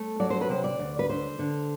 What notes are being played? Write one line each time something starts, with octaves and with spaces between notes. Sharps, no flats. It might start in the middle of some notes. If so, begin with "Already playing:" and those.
Already playing: A3
F#3 D5
C5
B4
C3 C5
D5
D2
B4
D3 C5
D3